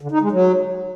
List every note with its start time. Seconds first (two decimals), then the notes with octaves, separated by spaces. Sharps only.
0.01 D3
0.11 D#4
0.22 G#3
0.32 F#3